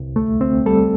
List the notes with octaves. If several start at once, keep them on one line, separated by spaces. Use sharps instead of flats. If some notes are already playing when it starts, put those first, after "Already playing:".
Already playing: C2
D2 A3
D2 C4
G3 A4